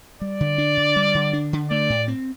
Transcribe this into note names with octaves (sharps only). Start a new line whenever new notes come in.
G3 D5
D3
D4
D3
G3
D3
D4
D3
A3 D5
A2
C4